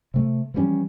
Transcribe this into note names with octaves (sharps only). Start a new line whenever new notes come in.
C3 A3
E3 F3 G3 C#4